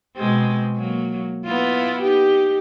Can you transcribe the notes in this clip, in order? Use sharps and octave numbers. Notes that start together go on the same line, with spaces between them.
B2 G#3 C4
F#3 A#3
B3 E4 F4
D#4 G4